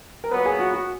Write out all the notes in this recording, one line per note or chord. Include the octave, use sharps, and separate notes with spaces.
A#4
A#2 F#3 B3 B4
G#4
F#4
F#4